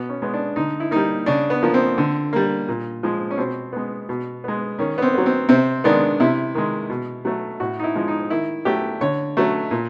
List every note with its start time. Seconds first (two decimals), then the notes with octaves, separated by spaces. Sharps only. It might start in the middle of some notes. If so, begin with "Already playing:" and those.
Already playing: B2 B3
0.09 C#4
0.22 G#3 B3
0.33 D4
0.56 D3 D#4
0.80 E4
0.91 G3 A#3 D#4
1.26 C#3 D4
1.50 B3
1.63 F3 A#3
1.74 C4
1.98 D3
2.33 G3 A#3
2.68 A#2
3.03 F3 G#3
3.31 C#4
3.37 B2 C4
3.73 G#3 B3
4.09 B2
4.44 G#3 B3
4.79 D#3 C#4
4.98 B3
5.02 C4
5.14 F#3 B3
5.26 C4
5.49 C3 C4
5.84 D#3 G#3 B3 D4
6.20 C3 E4
6.55 D#3 G#3
6.90 B2
7.25 F#3 A3
7.60 A2 F#4
7.79 D#4
7.84 E4
7.95 F3 G#3
8.08 D#4
8.30 D#3 E4
8.65 F#3 A3 G4
9.01 D3 C#5
9.37 F#3 A3
9.71 A#2